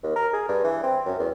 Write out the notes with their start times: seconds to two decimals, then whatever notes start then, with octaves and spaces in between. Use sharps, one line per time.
0.04 D#2
0.16 A#4
0.33 G#4
0.49 G2
0.64 E3
0.83 C4
1.06 F#2
1.19 E2